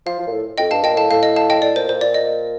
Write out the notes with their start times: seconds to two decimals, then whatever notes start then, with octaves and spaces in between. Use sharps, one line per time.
0.06 F3 F5
0.19 F3
0.27 A#2
0.32 A2
0.58 F2 D#5 G5
0.71 G2 F5 A5
0.84 A#2 D#5 G5
0.97 A2 F5 A5
1.10 A2 F5
1.23 D#5
1.36 F5 A5
1.50 D#5 G5
1.62 A2 D5
1.75 A#2 C5
1.89 A#2 C5
2.01 A#2 D5
2.14 D#5